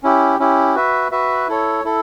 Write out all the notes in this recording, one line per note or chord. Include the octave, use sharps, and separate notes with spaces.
C#4 E4 G4
C#4 E4 G4
F#4 B4 E5
F#4 B4 E5
E4 A4 C#5
E4 A4